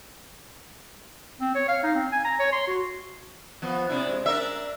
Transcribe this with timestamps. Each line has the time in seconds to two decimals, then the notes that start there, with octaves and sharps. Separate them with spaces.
1.41 C4
1.55 C#5
1.68 F5
1.83 D#4
1.95 C4
2.12 G#5
2.25 A#5
2.39 C#5
2.53 C6
2.67 F#4
3.62 F3 B3
3.89 C3 D4 E4
4.08 G#3
4.26 D4 A#4 E5